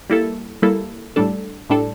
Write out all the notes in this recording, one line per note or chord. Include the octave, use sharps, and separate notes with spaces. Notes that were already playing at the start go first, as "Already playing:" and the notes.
G3 A#3 E4 A4
G3 A#3 E4 A4
A2 G3 D4 A4
A2 G3 D4 A4